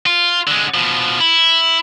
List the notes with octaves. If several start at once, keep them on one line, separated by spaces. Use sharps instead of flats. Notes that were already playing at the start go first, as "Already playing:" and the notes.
F4
D3 G#3
B2 F3
E4